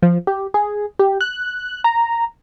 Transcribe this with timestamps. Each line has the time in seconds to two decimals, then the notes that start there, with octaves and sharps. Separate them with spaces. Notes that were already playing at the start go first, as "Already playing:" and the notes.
0.02 F3
0.27 G4
0.54 G#4
0.99 G4
1.21 F#6
1.84 A#5